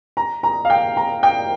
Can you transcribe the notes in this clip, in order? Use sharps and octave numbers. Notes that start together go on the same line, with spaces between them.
A#5
A#5
F5
G5
A#5
G5